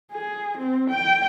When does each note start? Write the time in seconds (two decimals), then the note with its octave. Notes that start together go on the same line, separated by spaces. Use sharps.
0.12 G#4
0.58 C4
0.90 G5